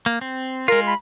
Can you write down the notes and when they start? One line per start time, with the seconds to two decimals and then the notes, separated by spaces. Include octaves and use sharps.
0.06 A#3
0.21 C4
0.68 G#3 F4 A#4
0.87 B5